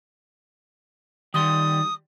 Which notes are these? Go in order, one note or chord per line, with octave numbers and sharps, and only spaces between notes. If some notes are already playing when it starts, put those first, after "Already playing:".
D#3 G3 C6 D#6